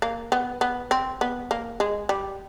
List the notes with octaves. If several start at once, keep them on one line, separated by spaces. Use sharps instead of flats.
A#3
B3
B3
C4
B3
A#3
G#3
G3